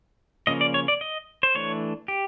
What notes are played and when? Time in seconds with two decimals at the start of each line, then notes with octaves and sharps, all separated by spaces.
0.47 C#3 F3 A#3 C#4 D#5
0.61 D5
0.74 C#5
0.88 D5
1.01 D#5
1.43 C5
1.55 E3 A3 D4 C#5
2.08 G4